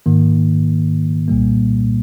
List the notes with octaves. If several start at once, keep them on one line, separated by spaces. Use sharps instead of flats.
G#2 D#3 A#3
C2 A#2 G3 A#3